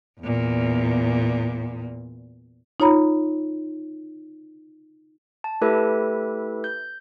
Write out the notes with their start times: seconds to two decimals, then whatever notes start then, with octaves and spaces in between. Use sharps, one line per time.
0.20 E2 A#2
2.80 D#4 F4 C#5 A#5 B5
5.44 A5
5.61 A3 E4 G4 A4 B4 E5
6.64 G6